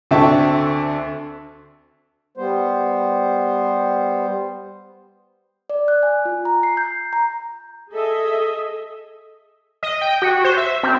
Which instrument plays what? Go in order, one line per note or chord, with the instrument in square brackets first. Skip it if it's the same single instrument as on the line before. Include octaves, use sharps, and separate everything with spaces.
[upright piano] D2 D3 C4 E5 A5 C#6
[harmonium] G3 B3 C5
[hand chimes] D5
F#6
G#5
F4
A#5
C7
G6
A#5
[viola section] G#4 A4 D#5 E5
[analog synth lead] D#5
G5
F#4
C5
E5
C4